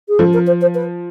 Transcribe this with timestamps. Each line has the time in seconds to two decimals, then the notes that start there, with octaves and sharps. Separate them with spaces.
0.09 G#4
0.19 F3 A4
0.33 A#4
0.47 C5
0.61 C5
0.75 B4